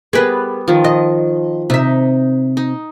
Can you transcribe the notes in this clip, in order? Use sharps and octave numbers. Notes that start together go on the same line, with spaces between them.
G3 B3 G#4 A#4 B4
D#3 F3
D#5
C3 D#4 E5
D#4